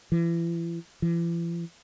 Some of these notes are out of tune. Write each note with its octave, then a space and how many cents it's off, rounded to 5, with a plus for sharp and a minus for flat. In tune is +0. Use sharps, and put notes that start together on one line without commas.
E3 +35
E3 +45